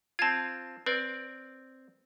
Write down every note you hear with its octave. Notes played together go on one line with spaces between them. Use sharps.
C4 F4 A5 G#6
C4 B4 D5